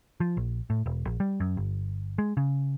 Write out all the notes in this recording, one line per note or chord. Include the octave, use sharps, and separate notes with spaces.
F3
A#1
A2
E1
A#1
G3
F#2
G1
G#3
C#3